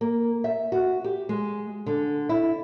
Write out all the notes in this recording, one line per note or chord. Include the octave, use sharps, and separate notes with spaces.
A#3
E5
F#4
G4
G#3
D3
E4